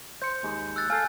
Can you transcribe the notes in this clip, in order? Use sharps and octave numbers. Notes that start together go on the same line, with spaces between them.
C5 G6 C#7
D#2 G#3
E6 F#6 A6
A4 F5 G#5 G6